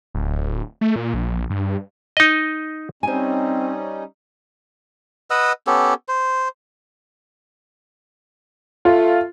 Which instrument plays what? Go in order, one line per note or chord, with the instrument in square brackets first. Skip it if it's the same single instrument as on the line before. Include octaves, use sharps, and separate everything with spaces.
[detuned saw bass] D1
A3
A#2
A#1
G2
[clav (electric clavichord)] D#4 D#5
[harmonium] G3 C#4 D#4 [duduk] C4 [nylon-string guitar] C5 G#5
[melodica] B4 D#5 F#5 E6
B3 C#4 G4 A4
C5
[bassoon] A3 [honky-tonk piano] F4